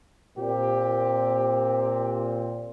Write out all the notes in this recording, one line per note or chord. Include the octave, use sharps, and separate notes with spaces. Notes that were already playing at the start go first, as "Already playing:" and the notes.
A#2 C4 G4